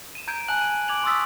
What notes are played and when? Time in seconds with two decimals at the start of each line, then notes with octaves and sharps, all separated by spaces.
0.15 D#7 E7
0.27 A#5 G6 G#6 D7
0.48 G#5 A5 F#6 F#7
0.61 D#7
0.88 D6 G#6 D7 F7 F#7
1.04 C6 C#6 D#6 E6 A6 B6